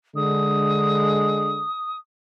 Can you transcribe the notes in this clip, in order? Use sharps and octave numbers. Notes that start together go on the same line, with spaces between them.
D3 G#3 D#6